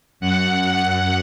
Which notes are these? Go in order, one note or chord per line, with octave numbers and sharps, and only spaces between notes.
F#2 F#5